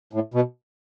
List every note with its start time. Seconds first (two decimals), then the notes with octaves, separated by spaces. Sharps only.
0.13 A2
0.34 B2